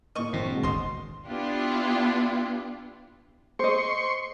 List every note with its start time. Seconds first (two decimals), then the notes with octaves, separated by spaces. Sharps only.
0.15 A2 A#3 D#5 C#6
0.33 A1 G2 A#2 C4 C7
0.51 B2 D3 G#3
0.63 D#1 G#1 D#5 C6
1.28 B3 D4 E4 F4 G4
3.59 C5 D#5 C6 C#6